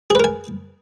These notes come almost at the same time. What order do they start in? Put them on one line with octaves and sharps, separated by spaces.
G#4 B4 A#4 G#5